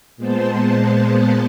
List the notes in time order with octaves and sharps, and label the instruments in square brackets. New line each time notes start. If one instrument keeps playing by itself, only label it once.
[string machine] A#2 G#3 B3 C5 A5